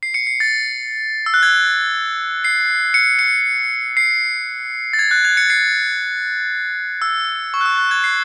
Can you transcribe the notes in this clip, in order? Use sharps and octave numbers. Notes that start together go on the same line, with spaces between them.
C7
C#7
C7
A6
E6
F#6
G#6
C7
C#7
C#7
C7
A6
G#6
F#6
G#6
C#7
C7
E6
C#6
F#6
E6
F#6
G#6
C7